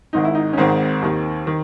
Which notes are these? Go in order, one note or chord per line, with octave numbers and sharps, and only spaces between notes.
G#1 G#2 D#3 D#4
E4
D#4
C#4
G#1 G#2 D#3 C4
D#2 D#3
D#3